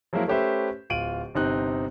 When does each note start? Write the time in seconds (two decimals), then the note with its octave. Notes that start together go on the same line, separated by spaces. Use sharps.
0.13 F3 F#3 G#3 A#3 E4
0.28 A3 C#4 G4 B4 C5 E5
0.90 D1 F4 D7 D#7 F#7
1.35 G1 C3 C4 D#4 F#6